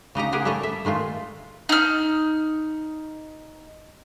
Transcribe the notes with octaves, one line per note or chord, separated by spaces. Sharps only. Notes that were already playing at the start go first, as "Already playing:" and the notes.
C#3 D#4 G4 A#5
G4 G#4 A#4 F#5
G3 A3 A4 C#5 D#5
E5
D#3 G#3 A3 F4
D#4 F6